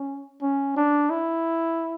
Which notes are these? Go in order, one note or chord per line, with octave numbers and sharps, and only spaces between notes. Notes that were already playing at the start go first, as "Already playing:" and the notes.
Already playing: C#4
C#4
D4
E4